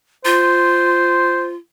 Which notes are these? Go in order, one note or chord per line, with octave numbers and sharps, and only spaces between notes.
F4 C5